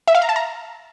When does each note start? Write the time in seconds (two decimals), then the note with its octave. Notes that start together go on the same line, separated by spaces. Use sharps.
0.08 E5
0.15 F5
0.22 A#5
0.29 A5
0.36 A#5